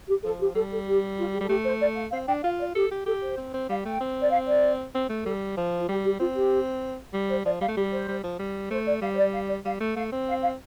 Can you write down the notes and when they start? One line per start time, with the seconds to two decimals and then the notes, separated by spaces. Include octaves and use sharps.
0.08 G4
0.23 F3 A4
0.40 G4
0.55 G3 A4
0.71 A4
0.87 G4
1.18 F4
1.33 G4
1.41 G3 A4
1.49 A3 G4
1.65 C5
1.81 D5
1.97 F5
2.12 C4 F5
2.28 D4 G5
2.43 F4 F5
2.59 D5
2.74 G4 A4
2.91 G4
3.06 G4 A4
3.22 C5
3.37 C4
3.54 C4
3.69 G3 F5
3.85 A3 G5
4.00 C4
4.22 D5
4.31 F5
4.47 D5
4.95 C4
5.10 A3
5.25 G3 A4
5.57 F3
5.79 F4
5.89 G3 G4
6.05 G4
6.20 C4 F4
6.36 G4
7.14 G3
7.30 C5
7.45 F3 D5
7.61 G3 F5
7.69 A3
7.77 G3 G4
7.92 C5
8.08 G3
8.24 F3
8.39 G3
8.71 A3 C5
8.87 D5
9.02 G3 F5
9.12 C5
9.18 D5
9.33 F5
9.49 D5
9.65 G3 F5
9.81 A3
9.97 A3 F5
10.12 C4
10.28 F5
10.43 F5